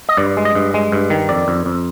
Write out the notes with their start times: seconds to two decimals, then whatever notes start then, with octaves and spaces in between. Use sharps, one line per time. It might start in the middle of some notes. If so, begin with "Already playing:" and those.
0.09 D#5
0.17 G2 D5
0.37 G#3
0.45 D#5
0.55 G2
0.74 G#3
0.92 G2
1.10 D#3
1.29 F2 D5
1.48 F2
1.66 F2